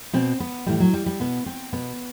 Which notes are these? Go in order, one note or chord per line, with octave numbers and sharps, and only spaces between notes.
B2 C4
B3
A2 E3 G3
F#3
G3
G3
B2 B3
C4
B2 B3